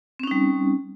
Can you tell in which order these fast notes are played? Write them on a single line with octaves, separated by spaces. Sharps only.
C4 C#4 D#4 G3